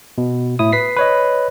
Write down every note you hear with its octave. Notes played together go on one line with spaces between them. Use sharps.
B2
A2 E4 D#6
B4 B6 C7
B4 C#5 D#5